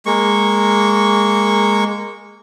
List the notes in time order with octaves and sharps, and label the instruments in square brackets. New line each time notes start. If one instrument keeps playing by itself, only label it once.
[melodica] G#3 A#3 C#6